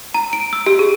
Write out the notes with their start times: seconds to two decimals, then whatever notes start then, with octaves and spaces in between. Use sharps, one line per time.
0.14 A#5
0.33 D7
0.53 E6
0.66 G4
0.79 G#4